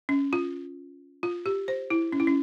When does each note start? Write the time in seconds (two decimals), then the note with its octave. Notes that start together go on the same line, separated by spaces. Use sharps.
0.09 C#4
0.33 F4
1.23 F4
1.46 G4
1.68 C5
1.90 E4
2.12 C#4
2.20 E4
2.27 C#4